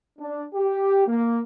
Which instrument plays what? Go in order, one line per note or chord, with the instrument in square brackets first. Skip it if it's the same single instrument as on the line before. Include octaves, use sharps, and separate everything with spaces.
[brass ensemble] D4
G4
A#3